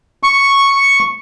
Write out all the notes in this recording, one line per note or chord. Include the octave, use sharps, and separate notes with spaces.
C#6